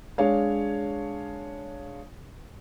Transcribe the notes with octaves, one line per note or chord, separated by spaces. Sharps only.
G#3 D4 C#5 F5